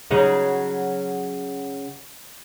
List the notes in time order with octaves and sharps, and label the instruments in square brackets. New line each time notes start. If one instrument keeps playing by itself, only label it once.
[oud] C#3 F#3 D#4